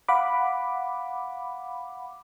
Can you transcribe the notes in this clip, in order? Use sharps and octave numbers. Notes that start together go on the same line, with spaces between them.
F5 F#5 B5 D6